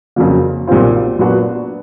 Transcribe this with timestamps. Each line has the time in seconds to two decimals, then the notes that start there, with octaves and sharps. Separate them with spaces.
0.16 F2 C#3 F#3 A#3
0.67 B1 A#2 G3 C4 F4
1.19 A#2 F#3 B3 D4 F#4